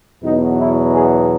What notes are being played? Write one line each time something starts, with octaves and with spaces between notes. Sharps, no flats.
E2 B2 F#3 D#4
E4
G#4